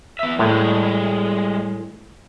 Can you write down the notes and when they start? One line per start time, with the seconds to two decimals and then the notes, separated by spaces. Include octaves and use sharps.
0.19 B3 E5
0.39 A2 G3 G#3 G#4